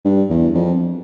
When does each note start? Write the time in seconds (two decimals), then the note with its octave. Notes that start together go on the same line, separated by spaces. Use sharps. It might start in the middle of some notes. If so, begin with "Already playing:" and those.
0.05 G2
0.30 E2
0.54 F2